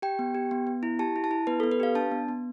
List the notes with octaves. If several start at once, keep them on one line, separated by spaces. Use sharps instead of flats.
G4 G5
B3
G4
B3
B3
E4
G4 A5
E4
A5
E4
B3 B4
A4
B3
B4
G4 F5
D4 A5
B3
B3